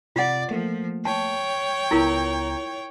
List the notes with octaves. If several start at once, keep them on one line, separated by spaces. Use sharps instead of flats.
C3 F4 D5 F#5
F3 A3 A#3
C#5 G5 A5
C#2 B3 E4 F4 A#4 A#5